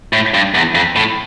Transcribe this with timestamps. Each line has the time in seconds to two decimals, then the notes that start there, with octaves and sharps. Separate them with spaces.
0.13 A2
0.34 G2
0.55 E2
0.75 F2
0.96 A2